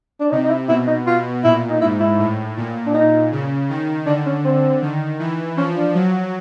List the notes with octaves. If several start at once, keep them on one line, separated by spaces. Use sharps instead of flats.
D4
C3 D#4
D#4
E4
B2 E4
D#4
B2 F4
A#2 E4
D#4
G#2 E4
E4
A2
A#2
D4
D#4
C#3
D#3
D3 D4
C#4
C4
D#3
E3
F3 C#4
D4
F#3